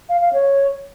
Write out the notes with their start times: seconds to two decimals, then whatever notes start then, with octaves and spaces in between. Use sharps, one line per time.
0.09 F5
0.21 F5
0.33 C#5